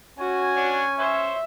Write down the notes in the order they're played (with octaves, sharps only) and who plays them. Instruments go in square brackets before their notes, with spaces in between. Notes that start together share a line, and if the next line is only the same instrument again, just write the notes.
[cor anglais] C#4 [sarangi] F#4 [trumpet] G#5
[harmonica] D4 C#5 F#5
[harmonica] C5 C#5 [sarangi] E5